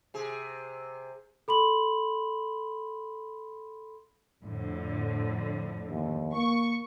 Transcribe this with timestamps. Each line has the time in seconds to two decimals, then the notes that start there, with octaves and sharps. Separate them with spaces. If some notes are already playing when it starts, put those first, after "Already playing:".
0.14 C3 G#4
1.48 A4 B5 C6 F#7
4.44 F2 A2 D3
5.90 D#2
6.35 A#3 C#6